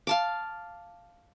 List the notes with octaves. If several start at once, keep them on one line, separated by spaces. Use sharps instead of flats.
F5 A5 D6